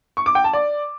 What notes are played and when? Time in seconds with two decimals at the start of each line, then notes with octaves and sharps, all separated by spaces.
0.17 C#6
0.26 D6
0.35 G5
0.44 A5
0.53 D5